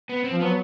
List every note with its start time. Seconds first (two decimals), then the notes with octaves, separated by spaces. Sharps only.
0.09 B3
0.24 C4
0.32 F3
0.41 F#3 B3